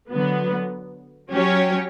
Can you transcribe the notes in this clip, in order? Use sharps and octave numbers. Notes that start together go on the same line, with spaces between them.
D3 F#3 B3
F#3 C#4 G4 C#5